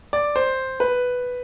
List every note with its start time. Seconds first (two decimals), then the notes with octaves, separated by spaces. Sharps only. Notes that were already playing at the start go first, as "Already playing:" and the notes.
0.13 D5
0.36 C5
0.80 B4